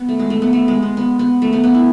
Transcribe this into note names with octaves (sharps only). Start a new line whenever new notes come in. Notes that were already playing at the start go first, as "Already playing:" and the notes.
Already playing: B3
A3
G#3
A3
B3
A3
G#3
B3
B3
B3
A3
B3
B3
E4